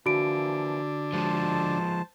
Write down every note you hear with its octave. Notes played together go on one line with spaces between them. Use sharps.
D3 E3 F3 A#3 D4 F#4 D7
F3 G#3 C5 A5